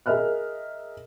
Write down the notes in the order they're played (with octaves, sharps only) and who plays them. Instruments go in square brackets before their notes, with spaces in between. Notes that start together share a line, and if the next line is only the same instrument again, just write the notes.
[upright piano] G#4 A#4 D#5 E5 F6 F#6